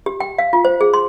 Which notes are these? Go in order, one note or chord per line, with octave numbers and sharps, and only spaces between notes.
G4
G5
F5
F4
C5
G#4
C6